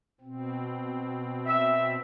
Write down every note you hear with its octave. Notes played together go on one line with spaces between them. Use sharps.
B2 C4
E5